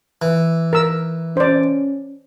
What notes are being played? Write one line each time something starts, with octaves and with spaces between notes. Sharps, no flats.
E3
A#4 E6
C#4 C5 D5